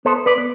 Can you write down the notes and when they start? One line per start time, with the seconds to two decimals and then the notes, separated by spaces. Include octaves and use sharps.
0.05 B3 A4 C5
0.26 B4 D5
0.38 B3